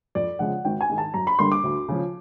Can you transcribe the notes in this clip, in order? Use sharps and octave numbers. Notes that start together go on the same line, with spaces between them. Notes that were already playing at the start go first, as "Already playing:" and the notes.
F2 D5
C#3 F3 G#3 F#5
G#1 G5
G#5
G#2 D#3 G#3
A5
F#2 A#5
B5
D3 G3 A#3 D4 C6
D6
D2
C#3 F3